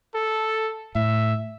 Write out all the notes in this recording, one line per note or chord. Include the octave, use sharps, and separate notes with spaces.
A4
A2 E5